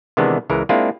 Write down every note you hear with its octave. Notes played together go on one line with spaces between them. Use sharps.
C3 D#3 E3 G#3 B3 D4
C#2 E3 G#3 A#4
G#3 A#3 C4 D4 E4 F4